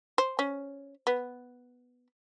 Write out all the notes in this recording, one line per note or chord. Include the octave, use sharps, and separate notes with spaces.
C5
C#4
B3